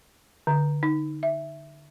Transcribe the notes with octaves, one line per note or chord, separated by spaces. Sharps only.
D3
D#4
E5